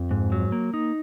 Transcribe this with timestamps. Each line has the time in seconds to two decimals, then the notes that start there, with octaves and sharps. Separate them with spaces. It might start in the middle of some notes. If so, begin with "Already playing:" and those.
Already playing: F2
0.11 G#2
0.32 F#3
0.52 A#3
0.74 D#4